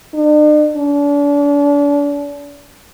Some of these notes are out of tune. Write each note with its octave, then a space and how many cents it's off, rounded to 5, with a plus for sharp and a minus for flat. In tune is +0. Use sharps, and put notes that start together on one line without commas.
D4 +45
D4 -40